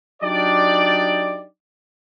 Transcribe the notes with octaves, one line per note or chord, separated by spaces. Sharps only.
F#3 D4 D#4 G4 D5